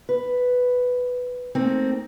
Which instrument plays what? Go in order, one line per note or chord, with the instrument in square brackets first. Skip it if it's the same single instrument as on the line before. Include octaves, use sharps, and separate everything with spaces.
[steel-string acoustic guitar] B4
A3 A#3 C4 D#4